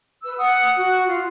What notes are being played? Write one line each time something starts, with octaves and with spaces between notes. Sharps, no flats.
B4 E6
F#5 D#6
F#4
F4